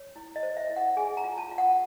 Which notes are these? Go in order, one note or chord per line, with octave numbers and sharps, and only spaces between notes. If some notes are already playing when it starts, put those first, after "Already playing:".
Already playing: C#5
E4
D#5
C5
E5
E4
F#5
G#4 G#5
A#5
F4
A5
F4
F#5